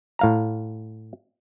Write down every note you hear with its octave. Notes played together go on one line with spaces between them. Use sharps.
A2 F5 A#5